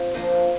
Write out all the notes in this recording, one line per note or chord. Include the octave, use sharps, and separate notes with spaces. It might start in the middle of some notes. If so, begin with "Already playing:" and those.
Already playing: C4 F4
F3 A#3 D4 C5 D#5